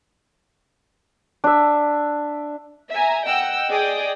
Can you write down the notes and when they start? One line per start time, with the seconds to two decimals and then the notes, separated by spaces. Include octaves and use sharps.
1.44 D4 E5
2.92 E5 G#5 A#5
3.28 D#5 F#5 G5 E6
3.70 G#4 D5 D#5 G5 D6 D#6